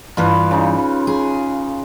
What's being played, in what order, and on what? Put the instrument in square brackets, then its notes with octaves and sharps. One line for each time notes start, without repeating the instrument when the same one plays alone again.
[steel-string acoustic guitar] G2 E3 [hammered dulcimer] F4 B4
[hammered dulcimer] C#3 D#4
[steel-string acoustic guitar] G#4